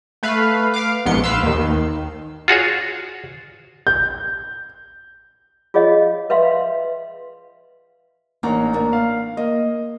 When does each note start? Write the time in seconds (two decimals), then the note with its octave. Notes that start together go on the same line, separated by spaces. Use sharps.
0.23 A3 B4 F5
0.74 F5 D6
1.06 A#1 G#2 B3 C6 C#7
1.24 B4 F5 C6 E6
1.42 D#2 D#3
2.48 F4 F#4 G#4 C#5
3.87 G6
5.74 F4 G#4 C#5 D#5 F5
6.30 B4 E5 F5 C6
8.43 A1 A#3 D4 D#4 A#5
8.73 A#3 D4
8.93 F5
9.37 A#3 D#5